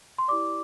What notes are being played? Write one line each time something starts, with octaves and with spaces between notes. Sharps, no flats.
C6
E4 G4 D5 D6